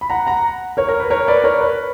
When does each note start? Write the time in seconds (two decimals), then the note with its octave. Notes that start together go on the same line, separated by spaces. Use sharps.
0.01 B5
0.10 F#5 A#5
0.27 F#5 A#5
0.77 A#4 C#5
0.89 A#4
1.00 B4
1.10 A#4 C#5
1.28 B4 D5
1.44 A#4 C#5
1.61 B4